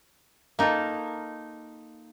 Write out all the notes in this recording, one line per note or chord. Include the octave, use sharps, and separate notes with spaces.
A#3 D#4 F4 A4